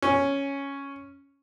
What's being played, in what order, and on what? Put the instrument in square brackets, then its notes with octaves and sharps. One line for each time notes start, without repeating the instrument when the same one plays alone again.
[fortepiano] C#4